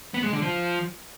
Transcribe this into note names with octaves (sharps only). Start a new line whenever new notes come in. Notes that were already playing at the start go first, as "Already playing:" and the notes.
B3
G#3
D3
F3